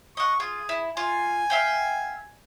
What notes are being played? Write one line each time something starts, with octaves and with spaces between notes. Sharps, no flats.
D#5 F#5 C#6
F4 G#4
E4
F4 G#5
E5 F5 G5